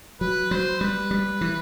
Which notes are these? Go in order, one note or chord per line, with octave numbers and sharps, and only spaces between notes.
F#3 B4
F#3 C5
G3 B4
G3
E3